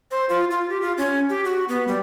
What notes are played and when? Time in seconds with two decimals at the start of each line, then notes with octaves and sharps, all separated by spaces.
0.11 C5
0.29 F4
0.51 F4
0.70 G4
0.82 F4
0.98 C#4
1.29 G4
1.45 F#4
1.69 B3
1.88 G3